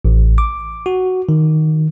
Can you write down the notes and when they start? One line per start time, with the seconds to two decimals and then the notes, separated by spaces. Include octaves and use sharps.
0.05 A1
0.38 D6
0.86 F#4
1.29 D#3